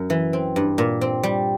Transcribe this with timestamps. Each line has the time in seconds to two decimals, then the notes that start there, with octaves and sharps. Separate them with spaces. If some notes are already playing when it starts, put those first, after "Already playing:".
Already playing: F#2
0.10 E3
0.33 C4
0.56 G2
0.78 A#2
1.01 C4
1.23 G3